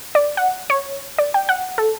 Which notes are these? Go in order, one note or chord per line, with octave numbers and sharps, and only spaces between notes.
D5
F#5
C#5
D5
G5
F#5
A4